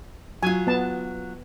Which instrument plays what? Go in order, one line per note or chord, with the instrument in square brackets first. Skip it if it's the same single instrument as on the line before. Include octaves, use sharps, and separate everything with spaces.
[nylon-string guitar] F#3 F4 [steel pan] G#5
[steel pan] B3 A5